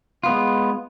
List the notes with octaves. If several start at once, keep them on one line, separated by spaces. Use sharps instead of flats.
G#3 B3 F4